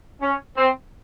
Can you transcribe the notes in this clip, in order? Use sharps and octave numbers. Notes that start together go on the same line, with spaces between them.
C#4
C4